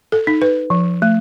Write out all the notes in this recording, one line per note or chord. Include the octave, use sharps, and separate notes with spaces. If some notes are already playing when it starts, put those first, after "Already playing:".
A4
D#4
B4
F3
A3